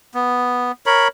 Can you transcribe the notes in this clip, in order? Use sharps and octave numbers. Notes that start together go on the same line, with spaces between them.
B3
A#4 C#5 B5